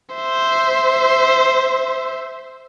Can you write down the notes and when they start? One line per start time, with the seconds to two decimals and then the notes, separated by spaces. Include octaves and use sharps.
0.15 C5 E5